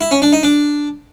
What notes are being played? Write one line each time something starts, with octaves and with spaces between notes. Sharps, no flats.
E4
C#4
D4
D#4
D4